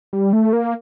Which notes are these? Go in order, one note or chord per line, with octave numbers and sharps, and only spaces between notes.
G3
A3
A#3